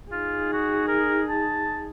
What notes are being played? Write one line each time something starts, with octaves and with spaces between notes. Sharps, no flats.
D#4 F4 G#4
F#4
A#4
A5